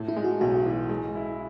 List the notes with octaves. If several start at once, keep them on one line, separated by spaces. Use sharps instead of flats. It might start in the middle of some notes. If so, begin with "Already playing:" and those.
Already playing: A2
E4
G#3
F#4
B1 F#4
E3
G#3
E4